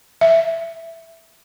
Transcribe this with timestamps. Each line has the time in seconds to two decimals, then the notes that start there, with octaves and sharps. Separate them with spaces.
0.21 E5